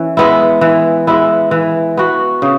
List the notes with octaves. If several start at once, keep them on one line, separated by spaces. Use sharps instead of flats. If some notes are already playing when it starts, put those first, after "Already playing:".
Already playing: E3 C#4
G#3 B3 E4
E3
G#3 B3 E4
E3
B3 F#4
C#3